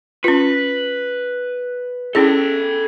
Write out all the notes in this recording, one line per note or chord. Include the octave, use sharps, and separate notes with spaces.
C#4 F4 B4
C#4 E4 G#4 A4 G5